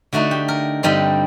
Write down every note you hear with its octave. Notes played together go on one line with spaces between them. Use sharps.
D3 A3 D#4 F#4
G4
A#4
G2 D3 G3 C4 D#4